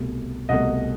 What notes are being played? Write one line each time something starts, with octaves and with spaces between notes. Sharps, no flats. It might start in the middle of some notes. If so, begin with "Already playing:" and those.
Already playing: C2 B2 A3
C2 B2 A3 D#5 F#5